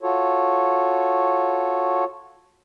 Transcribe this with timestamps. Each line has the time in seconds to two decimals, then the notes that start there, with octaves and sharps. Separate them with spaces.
0.03 F4 F#4 A4 C#5